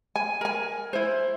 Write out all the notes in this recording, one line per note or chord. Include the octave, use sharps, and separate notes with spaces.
G#5
A#4 G#5
E4 C5